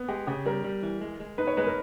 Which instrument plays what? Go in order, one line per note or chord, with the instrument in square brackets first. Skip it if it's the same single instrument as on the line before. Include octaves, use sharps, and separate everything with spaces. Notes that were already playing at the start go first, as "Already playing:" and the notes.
Already playing: [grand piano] B3
[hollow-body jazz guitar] G#3 [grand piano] G4
[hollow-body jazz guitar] C#3 [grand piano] G4
[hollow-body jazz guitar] G3 [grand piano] A#4
[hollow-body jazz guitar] G3
E3
G#3
G#3
[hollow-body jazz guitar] D#4 [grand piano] B4
[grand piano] C#5
[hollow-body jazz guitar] G#3 [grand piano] B4
[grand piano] A#4